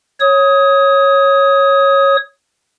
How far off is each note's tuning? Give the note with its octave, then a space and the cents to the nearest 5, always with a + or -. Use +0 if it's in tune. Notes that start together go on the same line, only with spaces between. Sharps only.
C#5 -10 D#6 +20